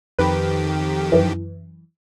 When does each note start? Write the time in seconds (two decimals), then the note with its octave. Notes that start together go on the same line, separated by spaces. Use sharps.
0.19 F2 D#3 G4 B4
1.12 F#2 E3